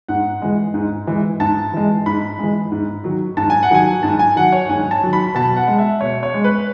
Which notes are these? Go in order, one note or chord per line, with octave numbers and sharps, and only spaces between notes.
G#2 F#5
E3 G#3
G#2
E3 G#3
G#2 A5
E3 G#3
G#2 B5
E3 G#3
G#2
D#3 F#3
G#2 A5
G#5
F#5
D#3 F#3 G#5
G#2 A5
G#5
D#3 F#3 F#5
C#5
G#2 G#5
A5
D#3 F#3
B5
B2 A5
F#5
G#3
E5
B2 C#5
C#5
G#3
B4